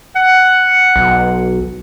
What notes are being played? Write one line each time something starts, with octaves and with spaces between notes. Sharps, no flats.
F#5
B1